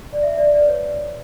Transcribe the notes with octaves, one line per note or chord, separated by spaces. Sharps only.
D5
E5
D5
D5
B4
C#5